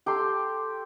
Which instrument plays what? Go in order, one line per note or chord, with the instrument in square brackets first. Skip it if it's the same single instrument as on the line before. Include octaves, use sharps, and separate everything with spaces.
[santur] G4 A4 C6